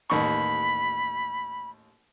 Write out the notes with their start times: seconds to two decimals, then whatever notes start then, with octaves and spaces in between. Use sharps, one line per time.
0.10 A1 D#2 B5 C#6